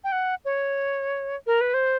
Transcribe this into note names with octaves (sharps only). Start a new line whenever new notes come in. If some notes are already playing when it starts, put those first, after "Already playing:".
G5
F#5
C#5
A#4
B4
C5